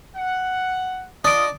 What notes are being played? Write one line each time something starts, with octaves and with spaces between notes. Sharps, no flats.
F#5
D4 F4 D#5 D#6 D7